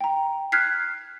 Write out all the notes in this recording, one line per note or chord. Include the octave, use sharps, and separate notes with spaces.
G5 A#5
F6 F#6 G#6 B6 C7